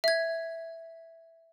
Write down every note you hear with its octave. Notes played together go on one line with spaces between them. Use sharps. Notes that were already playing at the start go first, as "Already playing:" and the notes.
E5 G#6